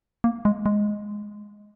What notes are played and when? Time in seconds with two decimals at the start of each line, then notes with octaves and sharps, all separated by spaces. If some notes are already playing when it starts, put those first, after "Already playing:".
0.24 A#3
0.45 G#3
0.66 G#3